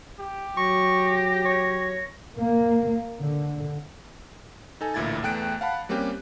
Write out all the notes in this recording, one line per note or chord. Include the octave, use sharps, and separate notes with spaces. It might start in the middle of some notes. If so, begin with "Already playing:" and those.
G4
F#3 C#6 A#6
C#5
A#3
D3
D#4 A4 G#5
A1 D2 A#2 E4 G#6 A6
E2 A3 G5 F#6 D7
F5 F#5 A5 B5
G3 A#3 C4 C#4 G4